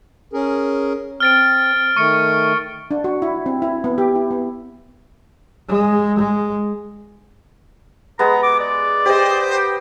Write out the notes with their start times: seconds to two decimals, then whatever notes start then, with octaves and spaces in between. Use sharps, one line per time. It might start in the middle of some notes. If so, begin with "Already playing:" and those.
0.33 C#4 G#4 A#4
1.20 C4 F6 A6 D7
1.97 D#3 A3 C#6 C#7
2.91 D4
3.04 F#4
3.22 E4
3.46 C4
3.62 E4
3.84 B3
3.98 G4
4.16 E4
4.31 B3
5.69 G#3
6.19 G#3
8.19 G#3 B3 A#5
8.43 D6
8.59 D5
9.05 G4 C5 D#5
9.56 G5